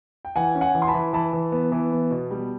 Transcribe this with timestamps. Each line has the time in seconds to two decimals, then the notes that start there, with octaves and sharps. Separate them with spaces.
0.25 G5
0.36 E3 F#5 G#5
0.55 C#4
0.61 F#5 G#5
0.75 E3
0.82 C6
0.88 A5 B5
0.94 E3
1.13 E3 A5 B5
1.33 E3
1.52 B3
1.72 E3
1.92 B3
2.11 B2
2.31 G3